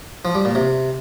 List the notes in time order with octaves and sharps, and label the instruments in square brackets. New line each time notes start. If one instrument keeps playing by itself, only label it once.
[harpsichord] F3
G3
A#2
C3